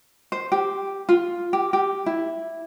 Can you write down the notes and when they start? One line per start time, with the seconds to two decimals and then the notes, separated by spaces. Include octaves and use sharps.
0.32 C5
0.52 G4
1.09 F4
1.53 G4
1.73 G4
2.06 E4